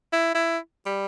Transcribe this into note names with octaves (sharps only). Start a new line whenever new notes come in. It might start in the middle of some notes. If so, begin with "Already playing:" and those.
E4
E4
G3